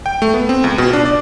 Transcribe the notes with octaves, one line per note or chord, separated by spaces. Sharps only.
G5
A3
B3
C4
C#2
B2
D4
D5